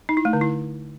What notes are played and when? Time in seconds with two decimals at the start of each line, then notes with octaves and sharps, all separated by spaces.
0.09 D#4
0.17 E4
0.25 A3
0.33 D3
0.41 E4